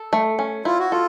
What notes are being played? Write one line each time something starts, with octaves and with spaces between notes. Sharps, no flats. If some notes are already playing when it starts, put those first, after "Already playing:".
Already playing: A4
A3
C#4
E4 F4
F#4
F4 A4